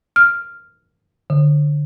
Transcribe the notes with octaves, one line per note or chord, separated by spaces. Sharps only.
F6
D3